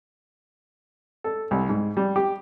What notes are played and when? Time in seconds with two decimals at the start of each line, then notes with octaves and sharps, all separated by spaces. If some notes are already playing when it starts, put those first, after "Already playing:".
1.24 A4
1.51 C2
1.69 G#2
1.97 G3
2.16 G4